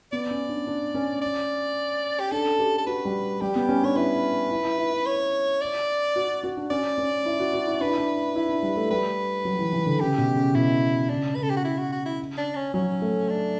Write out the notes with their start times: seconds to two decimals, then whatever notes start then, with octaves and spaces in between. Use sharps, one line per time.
0.12 B3 D5
0.31 C#4
0.49 D4
0.67 D4
0.95 C#4
1.22 D5
2.20 G4
2.32 D4 A4
2.59 G4
2.78 A4
2.87 F#4 B4
3.05 G3
3.41 G3 G4
3.55 B3
3.69 C#4
3.83 D4 C#5
3.96 E4 B4
4.51 E4
4.65 E4
4.78 E4
4.92 E4
5.06 C#5
5.61 D5
6.16 F#4
6.44 F#4
6.57 D4
6.70 C#4 D5
6.98 C#4
7.26 E4
7.40 F#4
7.53 F#4
7.67 E4
7.81 D4 B4
7.89 E4
7.98 D4
8.36 E4
8.49 D4
8.63 G3
8.77 A3
8.91 G3 B4
9.45 F#3
9.59 E3
9.73 E3
9.86 D3
10.00 C#3 G4
10.18 B2
10.37 C#3
10.55 B2 E4
11.09 C#3 D4
11.35 C#3 B4
11.42 A4
11.50 G4
11.57 F#4
11.65 E4
11.78 F#4
11.92 F#4
12.06 E4
12.38 D4
12.56 C#4
12.74 F#3 C#4
13.02 A3
13.29 D4